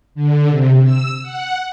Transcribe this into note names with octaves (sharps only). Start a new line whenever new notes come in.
D3
C3
E6
F#5